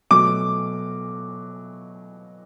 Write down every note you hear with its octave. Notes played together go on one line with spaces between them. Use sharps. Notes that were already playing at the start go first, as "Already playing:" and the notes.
B2 F#3 A3 D6